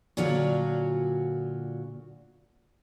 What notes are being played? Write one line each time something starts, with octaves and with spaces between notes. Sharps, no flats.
A#2 D3 F#3 F4 F#4